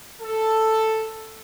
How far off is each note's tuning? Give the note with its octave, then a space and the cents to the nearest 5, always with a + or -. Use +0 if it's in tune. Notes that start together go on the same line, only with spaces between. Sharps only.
A4 +5